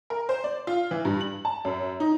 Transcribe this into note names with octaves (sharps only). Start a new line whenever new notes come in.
A#4
C5
D5
F4
E3
G2
F#7
A5
F#2
D#4